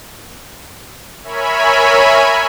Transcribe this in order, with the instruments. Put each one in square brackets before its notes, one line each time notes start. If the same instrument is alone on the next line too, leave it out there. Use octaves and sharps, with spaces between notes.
[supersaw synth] A#4 C#5 E5 G#5 B5